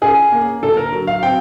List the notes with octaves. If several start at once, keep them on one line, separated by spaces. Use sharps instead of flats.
C#4 G#4
A#3
D3 A4
A#4
F#3
F5
C4 G5